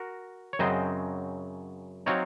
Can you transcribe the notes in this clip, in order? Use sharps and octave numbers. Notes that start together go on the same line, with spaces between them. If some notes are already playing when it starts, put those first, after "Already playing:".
Already playing: F#4 A#4
C#5
F#2 C#3 F#3 C4 C5 D#5
F#3 C4 D#4 C#5 F5